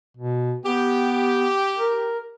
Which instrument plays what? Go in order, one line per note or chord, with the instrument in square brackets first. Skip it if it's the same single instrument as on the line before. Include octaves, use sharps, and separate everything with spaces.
[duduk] B2
[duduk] B3 [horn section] G4
[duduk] A#4